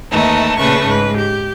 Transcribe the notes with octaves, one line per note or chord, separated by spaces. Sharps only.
D#2 E3 A3 D#4
A#2 C#3 A3 B4 C#6
G#2 B4
G4